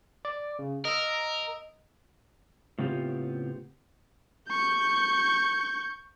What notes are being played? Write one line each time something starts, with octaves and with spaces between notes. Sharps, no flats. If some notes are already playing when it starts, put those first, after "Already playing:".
D5
C#3
A#4 D#5 E6
A2 C#3 B3 C4 F4 G4
C#6 G6